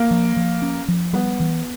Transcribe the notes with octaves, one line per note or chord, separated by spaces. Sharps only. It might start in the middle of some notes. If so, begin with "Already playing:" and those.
Already playing: A#3
F3
F3
C#4
F3
G3 B3
E3